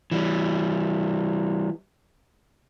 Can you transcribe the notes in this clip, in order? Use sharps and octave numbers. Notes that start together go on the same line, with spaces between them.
E3 G3